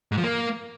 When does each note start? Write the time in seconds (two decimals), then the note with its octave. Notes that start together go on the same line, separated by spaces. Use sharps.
0.12 G#2
0.17 F3
0.23 A#3